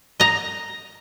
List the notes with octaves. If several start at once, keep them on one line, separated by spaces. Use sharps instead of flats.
D#5 A#5